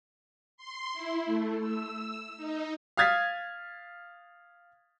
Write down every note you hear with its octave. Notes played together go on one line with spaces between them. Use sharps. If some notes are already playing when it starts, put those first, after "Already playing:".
C6
E4
A3
E6
D#4
F5 D#6 F6 G#6 A6 B6